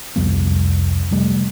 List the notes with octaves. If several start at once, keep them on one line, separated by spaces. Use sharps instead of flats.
C2 F2 G3 B3
C3 F3 G3 A3